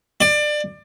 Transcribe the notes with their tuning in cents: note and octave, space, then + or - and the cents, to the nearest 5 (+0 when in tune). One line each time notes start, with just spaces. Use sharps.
D5 +25